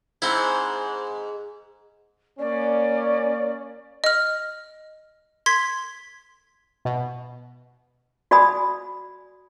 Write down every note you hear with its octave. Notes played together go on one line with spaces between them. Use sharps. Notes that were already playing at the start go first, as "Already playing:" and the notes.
G#2 C4 E4
A#3 C#4 D5
D#5 F6
C6 G#6 B6
B2
F#4 D5 G#5 B5 D#6